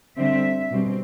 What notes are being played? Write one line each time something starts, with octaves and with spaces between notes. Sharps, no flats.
D3 G3 C4 E5
B2 G3 C4